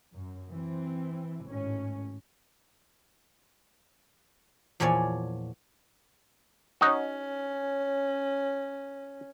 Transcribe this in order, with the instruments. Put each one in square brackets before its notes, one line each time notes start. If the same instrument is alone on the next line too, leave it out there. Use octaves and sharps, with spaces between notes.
[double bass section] F#2
E3 C4
G#1 A2 C#4
[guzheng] E2 A#2 F3 C#5 D5 G#5
[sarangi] C#4 [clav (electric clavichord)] D#4 F#4